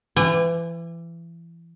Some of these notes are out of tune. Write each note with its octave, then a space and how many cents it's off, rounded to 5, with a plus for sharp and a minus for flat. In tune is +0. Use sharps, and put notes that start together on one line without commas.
E3 +30 G#5 -35